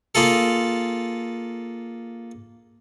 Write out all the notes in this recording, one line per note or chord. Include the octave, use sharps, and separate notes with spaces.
A#3 F4 G#4 A4